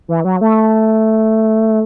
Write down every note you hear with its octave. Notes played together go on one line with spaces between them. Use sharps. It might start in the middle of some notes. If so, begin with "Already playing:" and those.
E3
F#3
A3